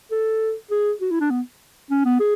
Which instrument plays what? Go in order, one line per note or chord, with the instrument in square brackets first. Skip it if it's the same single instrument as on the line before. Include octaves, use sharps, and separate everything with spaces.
[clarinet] A4
G#4
F#4
E4
D4
B3
C#4
B3
G#4